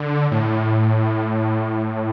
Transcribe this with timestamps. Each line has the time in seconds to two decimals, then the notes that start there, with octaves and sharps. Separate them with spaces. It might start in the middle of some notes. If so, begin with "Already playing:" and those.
Already playing: D3
0.31 A2